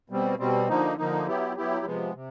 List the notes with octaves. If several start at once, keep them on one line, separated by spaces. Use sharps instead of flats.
B2 G3 C4
B2 G3 C4
D3 F3 A#3 D#4
D3 F3 A#3 D#4
F#3 B3 E4 G4
F#3 B3 E4 G4
C3 F3 G#3 B3
C3